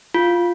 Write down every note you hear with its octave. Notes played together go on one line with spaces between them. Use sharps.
F4